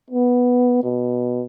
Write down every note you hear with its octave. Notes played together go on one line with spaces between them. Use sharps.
B3
B2